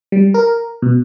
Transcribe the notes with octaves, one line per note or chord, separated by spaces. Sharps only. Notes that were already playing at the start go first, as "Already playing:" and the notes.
G3
A#4
B2